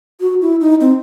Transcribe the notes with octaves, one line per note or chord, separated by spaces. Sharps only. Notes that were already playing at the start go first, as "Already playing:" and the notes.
F#4
E4
D#4
C4